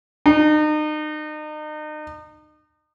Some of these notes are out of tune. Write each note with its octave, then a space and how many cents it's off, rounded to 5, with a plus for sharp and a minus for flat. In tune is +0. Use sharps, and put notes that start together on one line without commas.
D#4 -35